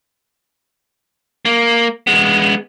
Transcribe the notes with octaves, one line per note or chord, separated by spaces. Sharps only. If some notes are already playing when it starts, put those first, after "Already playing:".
A#3
G#3 B3